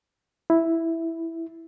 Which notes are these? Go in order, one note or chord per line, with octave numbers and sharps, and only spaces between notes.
E4